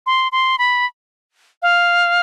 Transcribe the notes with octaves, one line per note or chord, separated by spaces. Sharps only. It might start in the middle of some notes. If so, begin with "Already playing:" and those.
C6
C6
B5
F5